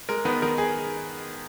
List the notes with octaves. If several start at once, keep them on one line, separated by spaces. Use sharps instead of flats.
G#3 A#4
D#3 B3 B4
D#3 A#4
G#4